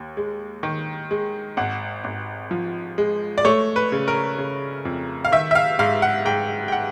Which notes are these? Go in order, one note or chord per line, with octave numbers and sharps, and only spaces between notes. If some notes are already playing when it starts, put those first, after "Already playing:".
Already playing: D#2
G#3
D#3
G#3
G#1 F#5
G#1
F3
G#3
D5
A3 C#5
B4
C#3
A#4
C#3
F2
F5
D#3 E5
E5
F5
G#2 F5
F#5
G#2 G5
G5
F#5